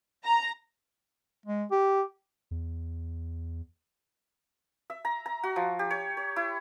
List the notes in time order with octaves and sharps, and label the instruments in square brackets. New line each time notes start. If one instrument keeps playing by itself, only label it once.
[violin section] A#5
[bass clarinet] G#3
G4
[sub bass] E2
[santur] E5
A#5
A#5
F#4
F3
G4
C#5
C#5
E4